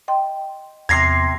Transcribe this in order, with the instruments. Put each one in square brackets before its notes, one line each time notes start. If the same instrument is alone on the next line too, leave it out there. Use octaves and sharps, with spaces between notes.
[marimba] D#5 G5 C6
[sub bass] E2 [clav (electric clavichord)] C3 A#5 [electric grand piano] G#6 A#6 C7